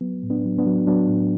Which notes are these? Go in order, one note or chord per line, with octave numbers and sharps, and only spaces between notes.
F#3 B3
A2
B3 D4
F#3
B3 D4
F#3
F#3 B3 D4
A2